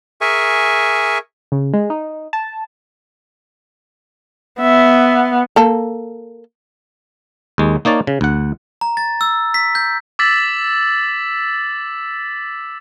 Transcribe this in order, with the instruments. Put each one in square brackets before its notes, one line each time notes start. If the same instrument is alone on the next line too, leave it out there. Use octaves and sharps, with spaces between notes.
[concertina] G#4 A#4 E5 G#5 C#6
[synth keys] C#3
G#3
D#4
A5
[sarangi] B3 [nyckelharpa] E5
[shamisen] A#3 A4
[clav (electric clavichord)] D#2 G#3
A#3 D#4 C#5 D5 A5
C#3
D2 F#5
[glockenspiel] A#5
A6
E6
B6
G6
[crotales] D6 E6 A6 B6 F#7